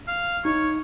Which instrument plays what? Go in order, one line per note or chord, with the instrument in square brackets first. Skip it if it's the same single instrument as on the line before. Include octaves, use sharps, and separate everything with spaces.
[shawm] F5
[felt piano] D#4 [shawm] C#5